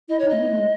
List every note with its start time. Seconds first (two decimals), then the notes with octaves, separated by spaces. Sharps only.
0.09 E4 D#5
0.19 C#5
0.24 D#4
0.29 A3 D#5
0.40 B3
0.50 A3
0.59 G#3